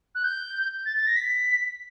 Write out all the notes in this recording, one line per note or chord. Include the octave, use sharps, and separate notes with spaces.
F#6
G6
A6
A6
A#6
B6